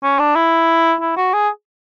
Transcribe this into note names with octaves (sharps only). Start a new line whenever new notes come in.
C#4
D4
E4
E4
F#4
G#4